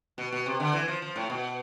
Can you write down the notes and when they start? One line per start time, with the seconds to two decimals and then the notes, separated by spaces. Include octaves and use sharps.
0.18 B2
0.32 B2
0.46 C3
0.60 D3
0.73 E3
0.88 F3
1.02 F3
1.16 A2
1.30 B2